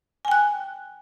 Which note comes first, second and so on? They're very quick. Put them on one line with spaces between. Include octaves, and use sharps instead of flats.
G#5 G5 F#6